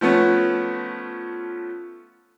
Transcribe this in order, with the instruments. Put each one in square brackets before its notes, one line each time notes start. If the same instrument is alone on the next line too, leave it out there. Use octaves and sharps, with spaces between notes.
[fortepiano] F3 A3 B3 C#4